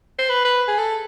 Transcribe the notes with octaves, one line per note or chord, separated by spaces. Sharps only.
C5
B4
B4
G#4
A4